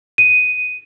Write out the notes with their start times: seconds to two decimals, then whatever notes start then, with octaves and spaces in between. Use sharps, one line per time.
0.18 D#7